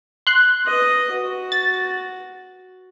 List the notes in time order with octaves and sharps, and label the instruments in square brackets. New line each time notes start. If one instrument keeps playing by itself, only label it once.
[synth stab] C6 F#6
[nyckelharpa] B4 D#5
F#4
[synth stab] A6